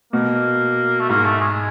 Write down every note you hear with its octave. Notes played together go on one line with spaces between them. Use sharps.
B2 A#3
A3
G#2 A#3
A3
G#3